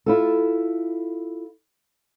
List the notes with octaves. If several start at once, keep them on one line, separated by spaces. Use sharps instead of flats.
E4 F4 A4